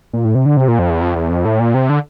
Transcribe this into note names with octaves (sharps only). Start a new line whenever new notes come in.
A#2
A2
C3
D3
C3
A#2
F2
E2
F2
E2
F2
A2
A#2
C3
D3